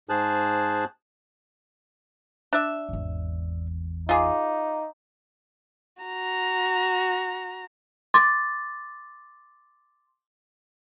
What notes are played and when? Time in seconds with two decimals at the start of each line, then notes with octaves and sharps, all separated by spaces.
0.09 G#2 G#4 C5 A5 F#6
2.53 D4 E5
2.89 G#1 E2
4.09 D#4 F4 G#4 F5 D6
6.03 F#4 A#5
8.14 C6 D6 A6